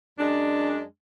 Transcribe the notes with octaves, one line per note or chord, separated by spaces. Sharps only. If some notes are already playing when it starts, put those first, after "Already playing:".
F#2 G#3 D4